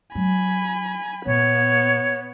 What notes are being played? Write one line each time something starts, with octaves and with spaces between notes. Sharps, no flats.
F#3 G#5 B5
A#2 B3 C#5